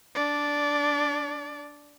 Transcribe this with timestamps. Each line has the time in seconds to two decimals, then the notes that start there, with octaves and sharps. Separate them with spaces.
0.15 D4 D5